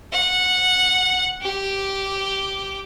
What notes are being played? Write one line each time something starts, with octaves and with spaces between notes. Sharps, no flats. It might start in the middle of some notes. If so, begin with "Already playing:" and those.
F#5
G4 D6